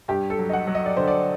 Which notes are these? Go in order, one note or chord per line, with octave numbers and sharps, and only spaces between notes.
G2 G4
A4
F#3
D#5
F#5
F#3
D#5
D5
D3 C5
D5